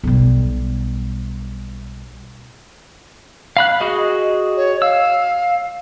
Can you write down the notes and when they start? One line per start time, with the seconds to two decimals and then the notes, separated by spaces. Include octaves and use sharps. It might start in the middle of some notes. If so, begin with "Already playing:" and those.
0.04 B1 G3
3.57 F5 B5 F#6
3.80 F#4 G#4 D#5
4.57 C#5
4.82 F5 E6